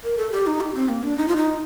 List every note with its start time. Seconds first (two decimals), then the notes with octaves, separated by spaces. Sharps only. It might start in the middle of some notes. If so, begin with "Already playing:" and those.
0.04 A#4
0.18 A4
0.32 G4
0.47 D#4
0.61 G4
0.75 C4
0.89 A#3
1.03 D4
1.17 D#4
1.28 F4
1.37 D#4